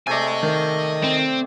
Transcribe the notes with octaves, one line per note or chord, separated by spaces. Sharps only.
C3 A3 D5 D#5 G#5
D#3
C4